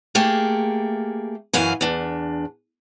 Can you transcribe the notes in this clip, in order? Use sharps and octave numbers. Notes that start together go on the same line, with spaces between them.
A3 A#3 G4 G#4
F#2 E3 F#3 F5 G#5
E2 D4